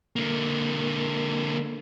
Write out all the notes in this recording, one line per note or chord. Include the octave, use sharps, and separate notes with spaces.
D3 A#3